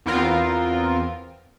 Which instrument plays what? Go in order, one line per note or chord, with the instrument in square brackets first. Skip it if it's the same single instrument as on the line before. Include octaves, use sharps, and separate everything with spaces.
[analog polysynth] E2 B3 C4 F4 A#4